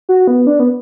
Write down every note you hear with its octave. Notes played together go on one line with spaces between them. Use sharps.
F#4
B3
D4
B3